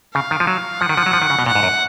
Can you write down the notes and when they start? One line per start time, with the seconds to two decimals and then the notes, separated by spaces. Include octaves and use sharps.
0.14 C#3 F5
0.31 D#3
0.40 F3
0.47 F#3
0.81 F3 F#5
0.89 D#3
0.97 F3
1.06 F#3
1.13 F3
1.22 D#3
1.30 C#3
1.39 B2
1.46 A#2 F#5
1.55 G#2
1.63 F#2